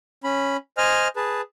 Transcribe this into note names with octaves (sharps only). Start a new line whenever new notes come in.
C#4 B5
C5 D#5 G#5 F6
G#4 B4 A5